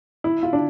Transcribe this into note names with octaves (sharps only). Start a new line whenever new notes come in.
E4
F4
D4